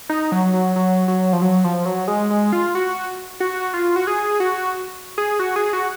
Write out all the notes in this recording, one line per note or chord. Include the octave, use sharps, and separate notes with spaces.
D#4
F#3
F#3
F#3
F#3
F3
F#3
F3
F#3
G#3
G#3
F4
F#4
F#4
F4
F#4
G#4
F#4
G#4
F#4
G#4
F#4